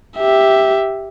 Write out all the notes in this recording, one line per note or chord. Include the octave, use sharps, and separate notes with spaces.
G4 E5